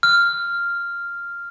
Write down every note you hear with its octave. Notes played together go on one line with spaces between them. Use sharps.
F6